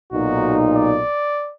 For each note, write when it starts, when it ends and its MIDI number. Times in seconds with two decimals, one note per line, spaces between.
0.12 1.02 35
0.12 1.02 46
0.12 1.02 63
0.12 0.56 66
0.76 1.52 74